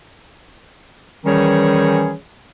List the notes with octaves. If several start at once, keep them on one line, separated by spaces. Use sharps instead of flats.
D#3 E3 G3 C#4 G#4 C#5